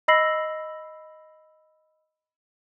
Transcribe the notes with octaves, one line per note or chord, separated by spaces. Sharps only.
D#5 B5 E6 A#6 C7 F#7